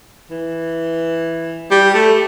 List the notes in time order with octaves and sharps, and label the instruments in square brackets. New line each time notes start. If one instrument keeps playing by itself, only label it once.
[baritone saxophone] E3
G3
A3